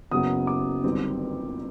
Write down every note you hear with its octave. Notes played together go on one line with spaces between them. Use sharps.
F#1 F#2 C#3 F#3 B3 D#6
D6
G1 F#2 D#3 G3 C4